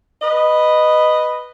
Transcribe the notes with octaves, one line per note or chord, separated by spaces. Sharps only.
B4 D#5